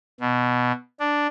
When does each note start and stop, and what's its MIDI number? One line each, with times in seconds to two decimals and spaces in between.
0.20 0.72 47
1.00 1.27 62